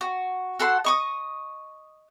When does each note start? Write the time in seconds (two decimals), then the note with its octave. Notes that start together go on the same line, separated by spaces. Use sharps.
0.01 F#4
0.59 F#4 A4 F#5 C6
0.84 D#5 C#6 D#6